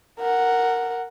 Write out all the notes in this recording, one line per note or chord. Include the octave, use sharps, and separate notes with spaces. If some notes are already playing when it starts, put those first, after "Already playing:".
A#4 F#5